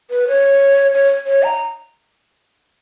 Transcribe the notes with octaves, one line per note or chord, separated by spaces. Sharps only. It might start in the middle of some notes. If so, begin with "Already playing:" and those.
B4
C#5
C#5
C#5
A#5